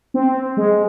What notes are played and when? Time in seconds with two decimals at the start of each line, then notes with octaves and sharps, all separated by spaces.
0.14 C4
0.57 G#3